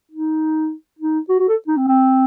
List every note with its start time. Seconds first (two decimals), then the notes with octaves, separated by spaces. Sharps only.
0.11 D#4
0.99 D#4
1.29 F#4
1.39 F#4
1.48 A4
1.68 D#4
1.77 C4
1.88 C4